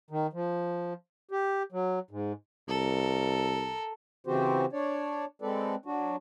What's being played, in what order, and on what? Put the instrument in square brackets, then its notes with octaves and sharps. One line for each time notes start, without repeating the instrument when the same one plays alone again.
[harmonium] D#3
F3
G4
F#3
G#2
[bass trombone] C2 [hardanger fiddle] A4 A#4
[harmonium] C#3 E3 C4 F#4 G4 C5
D4 C#5 D5
G#3 C4 A4 B4 D5
F#3 D4 F#4